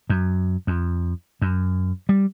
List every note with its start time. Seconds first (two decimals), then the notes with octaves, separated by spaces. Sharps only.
0.10 F#2
0.67 F2
1.42 F#2
2.09 G3